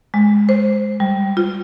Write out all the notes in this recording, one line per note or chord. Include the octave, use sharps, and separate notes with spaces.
G#3
C5
G3
F4